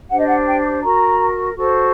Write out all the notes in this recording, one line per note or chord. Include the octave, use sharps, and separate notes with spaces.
D4 G4 C5 F#5
D#5
F#5
G5
F#4 A#4 A#5
F#4 A4 C5